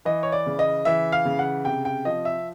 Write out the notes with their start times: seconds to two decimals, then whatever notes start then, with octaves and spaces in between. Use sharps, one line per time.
0.05 E3 D#5
0.23 C#5
0.32 D5
0.46 C#3
0.59 D#5
0.85 E3 E5
1.12 F5
1.25 C#3
1.39 F#5
1.65 C3 G5
1.85 G5
2.05 F3 D#5
2.25 E5